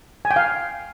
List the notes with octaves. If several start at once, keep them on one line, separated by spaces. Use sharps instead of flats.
G#5
G5
F5